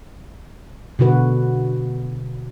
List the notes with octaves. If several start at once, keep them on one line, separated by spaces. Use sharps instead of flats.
B2 D3 F#4 B4